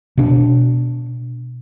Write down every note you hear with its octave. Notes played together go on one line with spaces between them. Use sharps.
B2 D4